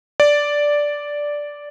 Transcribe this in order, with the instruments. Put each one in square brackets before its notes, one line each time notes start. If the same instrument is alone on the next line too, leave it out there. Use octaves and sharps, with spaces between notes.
[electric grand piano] D5